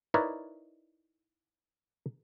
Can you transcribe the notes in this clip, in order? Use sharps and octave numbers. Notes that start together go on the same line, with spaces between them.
D#4 E4 A#4 B4 C#5 D5